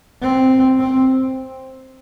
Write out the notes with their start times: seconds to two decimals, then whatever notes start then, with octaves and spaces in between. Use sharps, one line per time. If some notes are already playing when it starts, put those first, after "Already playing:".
0.22 C4
0.79 C4